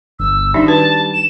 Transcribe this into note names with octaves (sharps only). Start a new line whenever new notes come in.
G1 E6
D#3 G3 D4 D#4 E5
F#4 B4 A5
E7